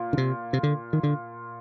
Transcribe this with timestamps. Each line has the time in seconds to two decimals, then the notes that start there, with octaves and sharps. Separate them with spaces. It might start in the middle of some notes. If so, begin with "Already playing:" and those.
Already playing: A#2
0.13 D3
0.18 C3
0.53 C3
0.63 D3
0.93 D#3
1.03 D3